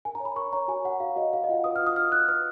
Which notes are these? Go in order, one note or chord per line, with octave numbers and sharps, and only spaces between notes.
A#4 G#5
A#5
C#5
B5
A#4 C#6
C#5 A#5
F#4 G#5
C#5 F#5
F#4 F5
F#4 D#5
B4 F5
D#5
F4 F5 F#5
B4 D#6
F6
F4
D#6
B4 F6
F4 F#6
B4 F6